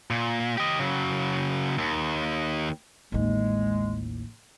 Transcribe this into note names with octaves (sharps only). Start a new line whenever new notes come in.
A#2
G4 D#5
C#3 F#3
D#2
A1 D#2 G#3